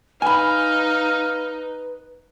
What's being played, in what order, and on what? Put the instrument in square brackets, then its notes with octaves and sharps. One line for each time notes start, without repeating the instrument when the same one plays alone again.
[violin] D#4 [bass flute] B4 [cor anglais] F5 [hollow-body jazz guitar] G#5 B5